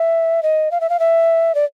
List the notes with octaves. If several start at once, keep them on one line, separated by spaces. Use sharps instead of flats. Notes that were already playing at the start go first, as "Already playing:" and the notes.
Already playing: E5
D#5
F5
E5
F5
E5
D5